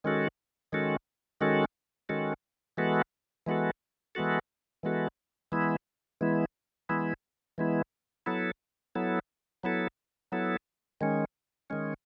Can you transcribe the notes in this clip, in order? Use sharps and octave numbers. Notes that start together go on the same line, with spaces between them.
D#3 G#3 C#4 F#4 A4
D#3 G#3 C#4 F#4 A4
D#3 G#3 C#4 F#4 A4
D#3 G#3 C#4 F#4 A4
E3 G#3 B3 F#4 A4
E3 G#3 B3 F#4 A4
E3 G#3 B3 F#4 A4
E3 G#3 B3 F#4 A4
E3 G#3 B3 E4
E3 G#3 B3 E4
E3 G#3 B3 E4
E3 G#3 B3 E4
F#3 B3 E4 A4
F#3 B3 E4 A4
F#3 B3 E4 A4
F#3 B3 E4 A4
D#3 G#3 C#4
D#3 G#3 C#4